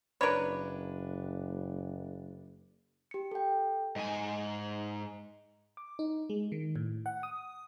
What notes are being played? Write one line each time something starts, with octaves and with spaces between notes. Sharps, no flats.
F#1 D4 A#4 B4 C#5 B5
G4 C#7
A4 G5
G#2 D#5 G#5
D6
D#4
G#3
D#3
A2
F#5
D#6